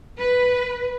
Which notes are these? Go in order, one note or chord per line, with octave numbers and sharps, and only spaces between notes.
B4